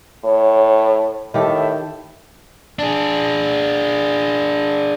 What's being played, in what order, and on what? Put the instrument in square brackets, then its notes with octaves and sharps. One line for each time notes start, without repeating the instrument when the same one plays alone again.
[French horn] A2 [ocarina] C#5
[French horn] A2 [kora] D#3 G4 A4 [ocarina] E5
[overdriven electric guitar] D4 G#4